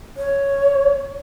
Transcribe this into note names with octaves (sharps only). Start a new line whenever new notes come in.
C#5